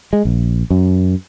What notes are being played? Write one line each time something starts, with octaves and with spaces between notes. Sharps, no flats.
G#3
A#1
F#2